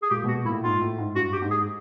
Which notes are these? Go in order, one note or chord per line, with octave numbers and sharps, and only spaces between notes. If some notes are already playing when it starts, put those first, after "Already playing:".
G#4
A#2 G4
B2
F#4
A#2 E4
A2
G#2 F4
A2
G#2
G2 F#4
G4
G#2
G#4